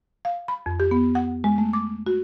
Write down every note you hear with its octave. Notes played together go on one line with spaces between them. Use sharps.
F5
B5
F2
G4
B3
F#5
G#3
A3
D6
F#4